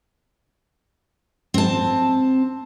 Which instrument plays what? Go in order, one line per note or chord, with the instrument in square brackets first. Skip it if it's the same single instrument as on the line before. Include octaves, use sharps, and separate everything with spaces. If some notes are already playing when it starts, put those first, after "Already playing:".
[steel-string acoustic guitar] C4 A5